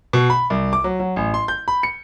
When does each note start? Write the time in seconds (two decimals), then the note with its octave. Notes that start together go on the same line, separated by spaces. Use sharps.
0.13 B2
0.30 B5
0.50 C2
0.73 D6
0.84 F#3
1.00 F#3
1.16 A1
1.34 C6
1.48 G6
1.68 B5
1.83 C#7